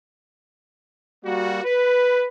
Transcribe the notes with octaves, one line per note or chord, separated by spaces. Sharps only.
G3 A#3 F#4
B4